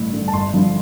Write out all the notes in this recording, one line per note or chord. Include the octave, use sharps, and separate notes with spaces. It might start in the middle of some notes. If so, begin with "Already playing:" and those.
Already playing: A1 G2 D3
G2 D3
A5
G1 C6
G2 D3 F3